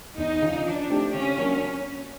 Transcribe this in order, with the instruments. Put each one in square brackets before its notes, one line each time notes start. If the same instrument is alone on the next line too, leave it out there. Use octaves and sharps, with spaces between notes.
[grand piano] E2 [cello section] D#4
[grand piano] C#3 F3
[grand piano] F3 [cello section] D4
[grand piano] A3 C4 D#4 G4
[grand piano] C#3 [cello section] C#4
[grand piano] F#3 A#3 D4 F#4